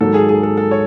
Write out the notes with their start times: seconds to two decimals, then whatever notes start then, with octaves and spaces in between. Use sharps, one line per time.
0.01 G#2 D#3 F#3 A4
0.14 G#4
0.29 G#4
0.43 A4
0.57 A4
0.71 C#5